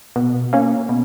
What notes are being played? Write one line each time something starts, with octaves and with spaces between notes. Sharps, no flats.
B2
A#3 C#4
B2